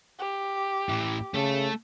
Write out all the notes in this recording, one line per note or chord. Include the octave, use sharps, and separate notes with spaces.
G4
A2 E3
C#3 A3 A4